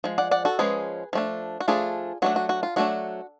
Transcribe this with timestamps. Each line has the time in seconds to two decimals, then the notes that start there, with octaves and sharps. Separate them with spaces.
0.04 F3 G#3
0.18 D5 F#5
0.31 D5 F#5
0.45 F#4 A4
0.59 F3 G#3 C#4 G#4 B4
1.13 F3 A3 D4
1.60 F#4
1.68 F3 A3 D4 F4 G#4
2.22 F#3 A3 D4 F#4
2.36 F#4
2.49 F#4
2.63 F4
2.76 F#3 A3 D4 F#4